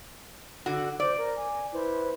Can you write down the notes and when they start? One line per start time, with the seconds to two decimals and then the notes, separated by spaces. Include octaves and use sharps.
0.66 D3 F#4
1.00 C5 D5 D6
1.17 A#4
1.36 G#5
1.73 E4 B4 C5